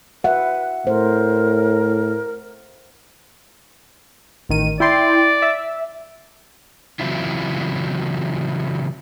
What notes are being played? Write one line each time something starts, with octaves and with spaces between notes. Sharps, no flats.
B4 E5 F#5
A2 A#4 C5
A1 D#3 D#7
E4 D5 G5 C6
E5
C#3 E3 F#3 C4 E4 F4